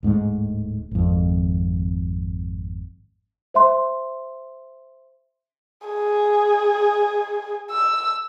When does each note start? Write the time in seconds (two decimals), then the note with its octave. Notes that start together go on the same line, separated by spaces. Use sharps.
0.03 D1 G#2 G#3 A3
0.91 G#1 F2
3.54 C5 E5 C6
5.87 G#4
7.71 E6